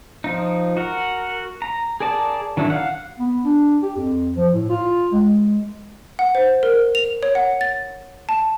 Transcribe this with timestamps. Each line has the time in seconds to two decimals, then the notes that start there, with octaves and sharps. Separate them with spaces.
0.24 F3 D#4
0.77 F#4 A#4
1.62 A#5
2.00 G#4 A#4 D5 A5
2.57 D#3 F#3 D4 E4
2.70 F5 F#5
3.19 B3
3.44 D4
3.82 G4
3.97 F2
4.37 F3
4.53 A2
4.70 F4
5.13 G#3
6.19 F#5
6.35 C5
6.63 A#4
6.95 F7
7.23 C#5
7.35 F#5
7.61 A6
8.29 A5